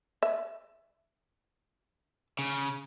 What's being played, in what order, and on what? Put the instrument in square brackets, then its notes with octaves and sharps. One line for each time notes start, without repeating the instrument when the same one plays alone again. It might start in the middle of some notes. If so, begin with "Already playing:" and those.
[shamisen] E5
[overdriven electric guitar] C#3